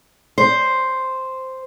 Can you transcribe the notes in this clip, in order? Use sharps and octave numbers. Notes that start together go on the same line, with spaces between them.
C5